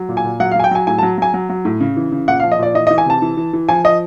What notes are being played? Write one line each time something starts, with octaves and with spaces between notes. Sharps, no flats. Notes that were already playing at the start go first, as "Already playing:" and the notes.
Already playing: F#3
A#2
G#5
A#2
F#3 F#5
F5
F#3 G#5
G5
F#3 G#5
A2 G#5
A5
F#3
F#3 G#5
F#3
F#3
A2
C#3
E3
C#3
A#2 F#5
F5
F3
D#5
A#2 D5
E3 D#5
D#5
E3
G#5
C3 A5
E3
E3
E3
F3 G#5
F3 D#5